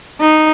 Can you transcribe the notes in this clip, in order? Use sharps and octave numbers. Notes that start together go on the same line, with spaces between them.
D#4